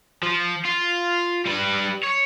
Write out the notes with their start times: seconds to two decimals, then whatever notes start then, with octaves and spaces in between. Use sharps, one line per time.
0.23 F3
0.65 F4
1.46 G3 B4
2.03 C#5